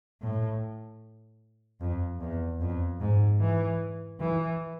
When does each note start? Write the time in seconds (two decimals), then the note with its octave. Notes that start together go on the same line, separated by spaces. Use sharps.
0.21 A2
1.81 F2
2.21 E2
2.61 F2
3.00 G#2
3.40 E3
4.20 E3